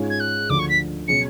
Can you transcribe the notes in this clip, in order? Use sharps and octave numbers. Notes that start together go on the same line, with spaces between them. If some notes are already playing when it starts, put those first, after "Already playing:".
Already playing: G#2 G#3 C#4 F4 G#4
G#6
F#6
D2 D3 F3 D6
C#6
B6
B2 F#3 C#4 G#4 C#7